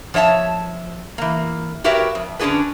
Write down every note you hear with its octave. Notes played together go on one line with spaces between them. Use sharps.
F3 C#5 E5 F5 A5
E3 A#3
F#4 G4 A#4 B4 C#5 E5
F2
D3 C#4 D4 F#4 G#4 B4